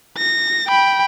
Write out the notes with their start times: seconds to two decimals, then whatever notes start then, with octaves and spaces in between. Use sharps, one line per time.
0.17 A#6
0.68 G5 B5